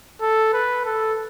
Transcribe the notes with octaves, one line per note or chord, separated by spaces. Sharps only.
A4
B4
A4